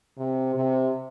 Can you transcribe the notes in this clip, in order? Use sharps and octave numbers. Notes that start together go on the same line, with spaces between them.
C3
C3